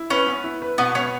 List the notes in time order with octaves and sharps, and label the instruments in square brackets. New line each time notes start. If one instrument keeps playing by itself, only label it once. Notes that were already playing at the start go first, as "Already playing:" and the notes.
Already playing: [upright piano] E4
[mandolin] C#4 [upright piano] B4
[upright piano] B3
E4
B4
[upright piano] B2 [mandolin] B3
[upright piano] B3 [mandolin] C#4